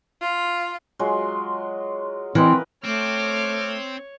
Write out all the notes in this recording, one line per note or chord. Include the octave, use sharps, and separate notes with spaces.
F4
F#3 G#3 F4
E3 C4 A#4 B4 D#5
A3 C4 C#5 D6 F6